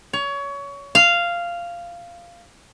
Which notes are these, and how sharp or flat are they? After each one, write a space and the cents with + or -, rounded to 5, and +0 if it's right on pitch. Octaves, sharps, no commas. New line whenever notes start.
C#5 +25
F5 -10